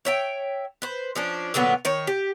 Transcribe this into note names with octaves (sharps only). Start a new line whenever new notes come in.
C#5 E5 G5
B4 C5
F3 C#4 D4
A#2 D3 F#3 B3
D#3 C#5
G4